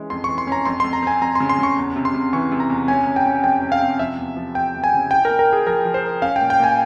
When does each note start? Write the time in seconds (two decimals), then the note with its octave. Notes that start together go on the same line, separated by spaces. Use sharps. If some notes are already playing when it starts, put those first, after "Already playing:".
Already playing: E3 G#3 C#4
0.10 F2 C6
0.24 E3 C#6
0.38 C6
0.47 C#4 A#5
0.65 F2 C6
0.80 F2 C6
0.93 A#5
1.03 C4 G#5
1.21 F2 A#5
1.35 C#3 C6
1.49 C6
1.59 C#3 C#6
1.77 E2
1.96 C3
2.05 C6
2.14 C3
2.33 E3 C#6
2.52 C3
2.60 A#5
2.70 E2
2.88 C#4 G#5
3.07 C#4
3.16 G5
3.26 C#4
3.44 F2 G5
3.62 C#4
3.72 F5
3.81 C3
3.99 F3 E5
4.18 E2
4.36 F3
4.55 E2 G5
4.74 E2
4.84 G#5
4.93 C#3
5.11 E4 G5
5.25 A#3 A#4
5.39 A#4
5.48 E4 G#4
5.66 F3 A#4
5.85 F3
5.94 C5
6.04 A#4
6.22 C#4 F5
6.36 G5
6.41 A#2
6.50 G5
6.59 A#2 G#5